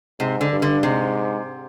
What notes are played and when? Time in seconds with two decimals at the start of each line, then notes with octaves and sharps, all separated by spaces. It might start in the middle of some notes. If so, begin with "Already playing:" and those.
0.20 G#2 C3
0.41 D3
0.52 G2
0.62 D3
0.83 G#2 C3